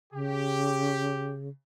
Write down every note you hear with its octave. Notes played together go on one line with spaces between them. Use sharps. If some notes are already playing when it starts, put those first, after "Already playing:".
C#3 G4